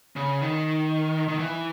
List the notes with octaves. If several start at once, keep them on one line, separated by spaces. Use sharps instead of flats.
C#3
D#3
D#3
E3